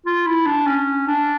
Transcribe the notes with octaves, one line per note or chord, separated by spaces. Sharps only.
F4
E4
D4
C#4
D4